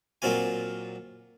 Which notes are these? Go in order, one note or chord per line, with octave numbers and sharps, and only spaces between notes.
A#2 F#3 C4 F4 G#5